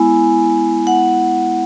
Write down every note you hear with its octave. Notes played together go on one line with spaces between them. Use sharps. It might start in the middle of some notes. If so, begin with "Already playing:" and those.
Already playing: G#3 B3 E4 G#5
F#5